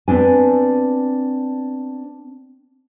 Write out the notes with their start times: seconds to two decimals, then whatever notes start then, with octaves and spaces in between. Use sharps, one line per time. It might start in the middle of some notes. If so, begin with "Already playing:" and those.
0.08 B3 C4 D4 G#5